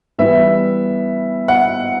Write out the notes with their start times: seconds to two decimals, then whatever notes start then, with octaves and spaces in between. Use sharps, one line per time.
0.18 E3 G3 B3 E5
1.48 F#5